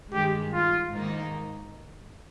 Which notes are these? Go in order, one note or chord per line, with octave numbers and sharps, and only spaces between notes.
G2 D#3 G#3 G4
F4
G#2 D#3 A#3 D#4